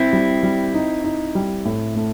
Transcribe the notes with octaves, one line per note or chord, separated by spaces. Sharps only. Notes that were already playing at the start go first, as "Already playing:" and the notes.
Already playing: C4 E4
G3
G3
D#4
D#4
G3
A2
A3